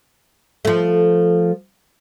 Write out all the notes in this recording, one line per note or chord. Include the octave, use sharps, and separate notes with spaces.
F3 A3